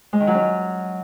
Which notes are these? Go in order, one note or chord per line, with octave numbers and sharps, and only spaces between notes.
G#3
D#3
F#3
C#4